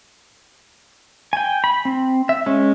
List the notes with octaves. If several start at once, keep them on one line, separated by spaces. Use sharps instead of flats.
G5 G#5
B5
C4
E5
G#3 C#4